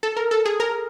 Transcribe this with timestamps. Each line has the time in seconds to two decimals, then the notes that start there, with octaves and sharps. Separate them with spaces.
0.03 A4
0.16 A#4
0.31 A4
0.45 G#4
0.60 A#4